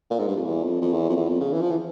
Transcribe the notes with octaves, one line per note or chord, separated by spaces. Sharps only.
A#2
G#2
G2
F2
E2
F2
F2
E2
F2
E2
F2
C#3
E3
F3
E3